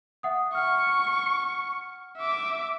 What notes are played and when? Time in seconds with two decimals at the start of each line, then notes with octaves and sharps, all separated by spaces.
0.23 E5 F#5 D#6
0.55 F#5 C#6 F6
2.18 E5 D6